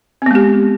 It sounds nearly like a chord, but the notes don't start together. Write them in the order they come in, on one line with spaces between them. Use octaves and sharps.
C4 B3 G#3 G4